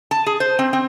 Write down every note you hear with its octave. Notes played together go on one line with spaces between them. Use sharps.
A5
G#4
C5
C4
C4